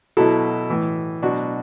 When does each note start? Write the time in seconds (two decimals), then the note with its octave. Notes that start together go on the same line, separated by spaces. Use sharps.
0.17 B2 F#3 E4 A4
0.70 A2 E3
1.22 B2 F#3 D4 F#4